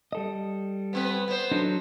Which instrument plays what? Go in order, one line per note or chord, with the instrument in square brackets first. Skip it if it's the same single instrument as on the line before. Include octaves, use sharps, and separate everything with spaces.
[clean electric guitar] G3 A4 D#5
[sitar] B3 C4 B4
B3 C5
[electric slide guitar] F#3 D4 A4 [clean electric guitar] D#4